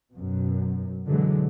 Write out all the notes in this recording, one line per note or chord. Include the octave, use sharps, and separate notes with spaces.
F#2 B2
B2 D3 E3 F#3 G#3